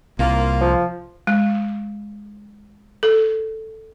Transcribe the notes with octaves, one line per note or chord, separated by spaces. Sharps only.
C2 A#3 F4
F3
G#3
A4